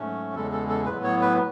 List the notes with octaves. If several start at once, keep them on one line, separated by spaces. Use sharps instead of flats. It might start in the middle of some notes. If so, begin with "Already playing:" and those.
Already playing: G#2 F#3 A3 C#4
E2 C#3 G#3 A4
A4
A4
A2 F#3 B3 B4
C#5
B4